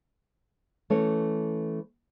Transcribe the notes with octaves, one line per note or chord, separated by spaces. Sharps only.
E3 A3 C#4 C#5